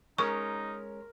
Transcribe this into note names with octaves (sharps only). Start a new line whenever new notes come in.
G#3 C#4 D#4 A#4 C#6